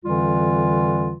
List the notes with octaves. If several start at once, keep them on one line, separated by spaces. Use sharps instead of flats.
F2 D3 E3 G3 F4